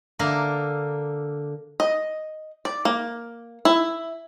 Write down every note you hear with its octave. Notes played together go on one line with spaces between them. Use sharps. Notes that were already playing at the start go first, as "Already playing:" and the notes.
D3 A#3 A#4
D#5
D5
A#3
E4